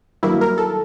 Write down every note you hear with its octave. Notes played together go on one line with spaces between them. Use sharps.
G2 D#3 F#3 A#3 E4
A#4
A4